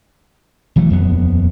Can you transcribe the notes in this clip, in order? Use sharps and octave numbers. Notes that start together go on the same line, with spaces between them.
E1 E3 F#3 A3
D#1 F2 B3